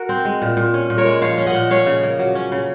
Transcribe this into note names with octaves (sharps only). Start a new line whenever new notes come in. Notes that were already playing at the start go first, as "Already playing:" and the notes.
Already playing: F#4 A#4
C4
G#3
A#2
A#2
C#4
A#2
A#4 C#5
G#3
F3 C#5 F5
C#4
D#5 F#5
A#2
C#4 C#5 F5
C#3
A#3
F#3
C#4
C#3